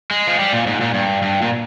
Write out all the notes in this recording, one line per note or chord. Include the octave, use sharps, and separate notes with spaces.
G#3
F3
G3
A#2
G#2
A#2
G2
G2
A#2